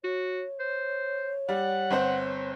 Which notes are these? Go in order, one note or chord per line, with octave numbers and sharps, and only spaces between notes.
F#4 C#5
C5
G3 F#5
G1 C4 C5